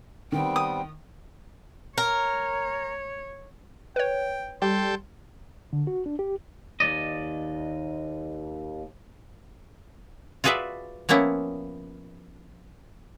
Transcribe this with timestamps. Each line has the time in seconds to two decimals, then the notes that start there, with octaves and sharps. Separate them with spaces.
0.32 D#3 G3 B3 C4 G5
0.56 D#6
1.98 A#4 C#5
3.96 B4 C#5 G5
4.62 G3 A4 G5 C6
5.73 D3
5.87 F#4
6.06 D4
6.19 G4
6.80 D#2 D5 D#5
10.44 F4 F#4 G#4 B4 D5 E5
11.09 F3 A#3 B3 C#4 E4